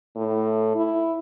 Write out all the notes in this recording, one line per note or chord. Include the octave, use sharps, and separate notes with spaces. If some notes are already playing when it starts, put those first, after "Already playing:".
A2
E4